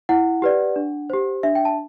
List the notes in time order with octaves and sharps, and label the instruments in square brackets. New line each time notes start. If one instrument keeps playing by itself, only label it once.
[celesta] E4 F#5
G4 B4 D5
D4
G4 C5
D4 E5
G5
A5